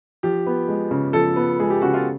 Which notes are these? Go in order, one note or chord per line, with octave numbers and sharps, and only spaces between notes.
F3 G4
B3
G#3
C#3
F3 A4
B3
G#3 G#4
G4
C#3 F#4
F4